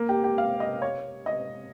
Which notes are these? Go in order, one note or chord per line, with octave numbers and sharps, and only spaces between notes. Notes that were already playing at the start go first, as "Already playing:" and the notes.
Already playing: A#3
G4
G4
F5
D#5
C#5
D#5